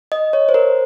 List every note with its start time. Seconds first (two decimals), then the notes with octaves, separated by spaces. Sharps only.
0.12 D#5
0.33 C#5
0.49 C5
0.54 A#4